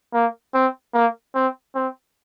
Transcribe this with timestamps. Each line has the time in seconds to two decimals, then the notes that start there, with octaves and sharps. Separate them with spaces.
0.14 A#3
0.54 C4
0.94 A#3
1.35 C4
1.75 C4